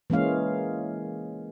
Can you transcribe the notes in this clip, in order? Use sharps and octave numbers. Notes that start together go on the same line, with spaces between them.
E3 G#3 A#3 C#4 F5